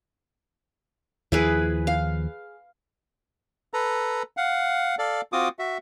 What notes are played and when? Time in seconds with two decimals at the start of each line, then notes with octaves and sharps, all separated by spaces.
1.32 D#2 F3 E4 G#4 B4
1.87 F5
3.74 A4 B4 A#5
4.37 F5 F#5
4.99 A4 D5 F5
5.33 C4 F4 F#4 D6 D#6
5.59 F#4 E5